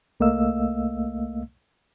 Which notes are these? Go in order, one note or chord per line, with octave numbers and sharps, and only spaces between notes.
C2 A3 A#3 D#5 F5 E6